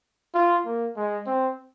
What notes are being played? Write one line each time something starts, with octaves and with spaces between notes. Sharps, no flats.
F4
A#3
G#3
C4